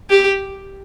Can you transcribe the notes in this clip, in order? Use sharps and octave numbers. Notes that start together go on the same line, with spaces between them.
G4